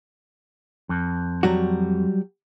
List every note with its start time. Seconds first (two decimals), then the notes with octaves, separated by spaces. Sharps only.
0.89 F2
1.43 F#3 G3 F#4